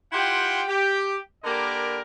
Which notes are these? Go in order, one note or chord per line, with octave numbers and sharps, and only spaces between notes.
E4 F4 G4 F#5 G5 C6
G4
D3 A#3 G4 A#4 D5 B5